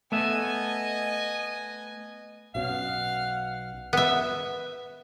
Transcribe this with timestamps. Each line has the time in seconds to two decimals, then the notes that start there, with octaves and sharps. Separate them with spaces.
0.12 A3 B3 D#5 E5 G#5
2.55 B1 B2 C#4 F5 F#5
3.93 B3 E5